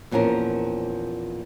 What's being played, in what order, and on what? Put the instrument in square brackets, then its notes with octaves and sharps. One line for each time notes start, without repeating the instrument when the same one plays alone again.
[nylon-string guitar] E2 A#2 F3 C#4 A#4